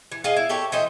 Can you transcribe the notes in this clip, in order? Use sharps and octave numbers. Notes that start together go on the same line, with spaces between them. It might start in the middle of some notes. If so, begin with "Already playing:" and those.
E3
F4 G#4 D#5
E4
G4 A4 C#5
E3 A3 C5 D#5